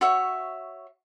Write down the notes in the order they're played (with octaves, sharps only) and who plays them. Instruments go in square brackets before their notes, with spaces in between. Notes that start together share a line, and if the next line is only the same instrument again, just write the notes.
[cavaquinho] F#4 C#5 E5